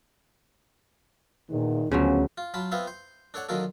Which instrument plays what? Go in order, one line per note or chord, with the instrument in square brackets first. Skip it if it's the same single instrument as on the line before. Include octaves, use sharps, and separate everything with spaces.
[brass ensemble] E2 [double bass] A#2 [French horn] D#3
[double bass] D2 [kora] C#3 F3 F#3 [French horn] B3 [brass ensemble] C#4
[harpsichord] F4
F#3 F4 A5 B5
B3 C4 F4 E5 F5
C5
D4 A4 C#5 F#5
D3 D#3 F#3 F4 F#4 A4